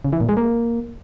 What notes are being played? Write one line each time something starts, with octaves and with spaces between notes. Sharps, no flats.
C#3
E3
A#2
G#3
A#3